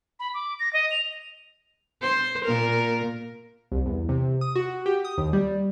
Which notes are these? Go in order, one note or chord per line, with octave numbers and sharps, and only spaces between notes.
B5
D6
A#6
D#5
F7
C5
A#2 A#4
C2
E2
C3
D#6
F#4
G4
D#6
D#2
G3